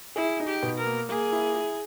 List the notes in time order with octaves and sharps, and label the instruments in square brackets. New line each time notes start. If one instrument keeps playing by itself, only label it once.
[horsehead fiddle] E4 [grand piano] G#4
[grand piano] D#4
[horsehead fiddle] G4
[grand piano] B2
[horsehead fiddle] A#4
[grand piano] A#3
[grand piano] A#3 [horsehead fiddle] G#4
[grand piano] E4
E4